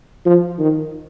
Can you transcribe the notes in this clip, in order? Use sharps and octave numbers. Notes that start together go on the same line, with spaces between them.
F3
D#3